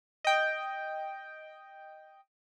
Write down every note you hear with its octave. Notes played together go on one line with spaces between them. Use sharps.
D#5 G5